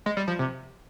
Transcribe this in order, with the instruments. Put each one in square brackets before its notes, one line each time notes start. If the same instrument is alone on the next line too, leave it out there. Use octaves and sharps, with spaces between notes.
[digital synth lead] G#3
G3
F3
C3